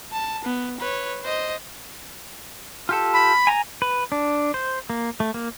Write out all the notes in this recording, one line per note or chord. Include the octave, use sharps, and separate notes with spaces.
A5
B3
B4 C#5
C5 D#5
F4 G4 A4
B5
G#5 A#5
B4
D4
C5
A#3
A3
A#3